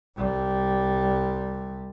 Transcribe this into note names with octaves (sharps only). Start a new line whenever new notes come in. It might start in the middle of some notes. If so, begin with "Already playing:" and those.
C2 G3